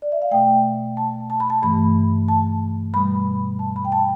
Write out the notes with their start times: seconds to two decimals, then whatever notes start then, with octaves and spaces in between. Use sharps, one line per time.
0.02 D5
0.12 E5
0.22 F5
0.31 B2 A3 G5
0.97 A5
1.30 A5
1.40 B5
1.50 A5
1.62 G2 E3 A3 B5
2.28 A5
2.94 B2 G3 B5
3.59 A5
3.76 B5
3.85 G5
3.92 A5